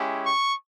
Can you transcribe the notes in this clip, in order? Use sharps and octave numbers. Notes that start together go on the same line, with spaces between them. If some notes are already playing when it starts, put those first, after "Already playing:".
Already playing: G#3 C#4 E4 G4
C#6